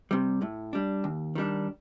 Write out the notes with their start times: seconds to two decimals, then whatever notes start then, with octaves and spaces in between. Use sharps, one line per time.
0.11 C3 G3
0.42 A2
0.73 G3 D4
1.04 D#2
1.35 D#3 G3 D4